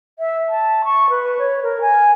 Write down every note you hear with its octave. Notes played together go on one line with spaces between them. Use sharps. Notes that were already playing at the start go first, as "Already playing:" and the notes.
E5
A5
C#6
B4
C#5
A#4
G#5